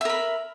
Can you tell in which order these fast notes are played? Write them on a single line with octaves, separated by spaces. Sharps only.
E5 A#4 B5